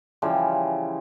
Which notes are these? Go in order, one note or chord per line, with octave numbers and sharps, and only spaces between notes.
C#3 E3 F3 G3